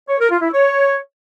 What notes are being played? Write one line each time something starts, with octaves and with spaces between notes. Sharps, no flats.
C#5
A#4
F4
E4
C#5